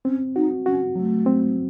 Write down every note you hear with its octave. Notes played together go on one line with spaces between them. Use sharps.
C4 C#4
D#4 F#4
C#4 F#4
F#3 A3
C4